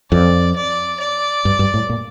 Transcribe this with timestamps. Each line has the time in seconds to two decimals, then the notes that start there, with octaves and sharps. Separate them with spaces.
0.11 F2 D5
0.56 D5
1.00 D5
1.45 G2
1.59 G2
1.74 A2
1.90 A#2